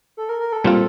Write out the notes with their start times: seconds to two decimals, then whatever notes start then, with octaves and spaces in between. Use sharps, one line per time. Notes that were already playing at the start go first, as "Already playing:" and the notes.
0.17 A4
0.29 A#4
0.40 A#4
0.52 A4
0.64 A#2 G3 C4 F4